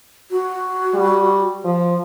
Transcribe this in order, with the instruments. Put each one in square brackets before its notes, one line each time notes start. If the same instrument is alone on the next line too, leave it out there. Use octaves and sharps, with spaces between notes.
[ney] F#4
[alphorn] G3
F3